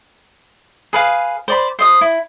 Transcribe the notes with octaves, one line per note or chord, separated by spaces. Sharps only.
G#4 B4 F5
C5 D5 B5
C5 D#5 D#6
E4